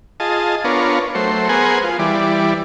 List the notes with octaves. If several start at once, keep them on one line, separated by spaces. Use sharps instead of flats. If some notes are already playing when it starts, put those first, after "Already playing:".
F4 G#4 D#5 A5
B3 D4 F4 A#4 C#5
F#3 A3 C5
B3 G#4 A#4 C5 F#5 G#5
F4
E3 G3 D5